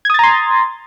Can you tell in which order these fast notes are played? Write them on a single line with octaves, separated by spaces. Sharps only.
G#6 D#6 A6 A#5 C6